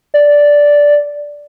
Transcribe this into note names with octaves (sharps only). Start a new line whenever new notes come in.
D5